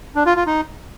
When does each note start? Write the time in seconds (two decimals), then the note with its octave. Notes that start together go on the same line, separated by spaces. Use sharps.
0.15 D4
0.26 F4
0.36 F4
0.47 D#4